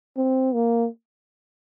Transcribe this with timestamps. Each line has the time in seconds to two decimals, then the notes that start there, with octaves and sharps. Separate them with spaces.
0.17 C4
0.54 A#3